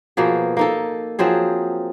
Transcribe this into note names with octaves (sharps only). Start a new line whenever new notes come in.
B2 F3 A#3 G#4
A#3 D#4 A4
F3 F#3 C4 G#4